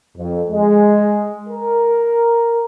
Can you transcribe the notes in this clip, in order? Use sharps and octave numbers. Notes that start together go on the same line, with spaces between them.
F2
G#3
A#4